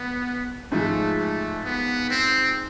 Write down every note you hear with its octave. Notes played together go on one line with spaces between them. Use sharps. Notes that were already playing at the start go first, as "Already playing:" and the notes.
Already playing: B3
G#2 F3 G#3 A3
A3
B3
C4